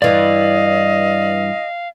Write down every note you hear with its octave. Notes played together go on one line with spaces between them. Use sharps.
G2 E3 D5 D#5 F5